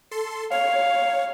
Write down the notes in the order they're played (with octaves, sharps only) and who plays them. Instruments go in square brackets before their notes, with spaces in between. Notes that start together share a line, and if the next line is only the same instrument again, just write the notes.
[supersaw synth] A4 C6
[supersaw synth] C#5 [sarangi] F5